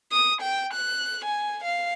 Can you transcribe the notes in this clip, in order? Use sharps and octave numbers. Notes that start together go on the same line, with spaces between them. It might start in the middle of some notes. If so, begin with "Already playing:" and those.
D#6
G5
F#6
G#5
F5